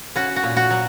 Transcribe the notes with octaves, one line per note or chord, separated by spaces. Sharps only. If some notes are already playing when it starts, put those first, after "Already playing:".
C#4 F#4
F#4
A#2
F#4
F#3